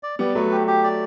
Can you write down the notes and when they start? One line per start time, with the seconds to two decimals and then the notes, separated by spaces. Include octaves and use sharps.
0.03 D5
0.19 G3 B3 D5
0.35 F#3 A3 B4
0.51 G4
0.67 G4
0.83 D5